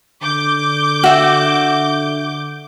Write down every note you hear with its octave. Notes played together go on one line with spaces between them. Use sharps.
D3 D6 G6
F#4 E5 F#5